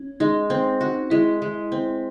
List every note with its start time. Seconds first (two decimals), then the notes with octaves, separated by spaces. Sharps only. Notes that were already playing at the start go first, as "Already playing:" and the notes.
Already playing: C#4
0.20 G#3 D#4
0.50 C4
0.81 F#4
1.10 G#3 E4
1.42 G#3
1.72 C4